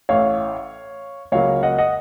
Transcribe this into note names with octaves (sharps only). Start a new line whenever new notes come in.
A1 A2 A3 C#5 F5
C#2 C#3 F#3 A#3 C#5 F5
D#5 F#5
D#5 F#5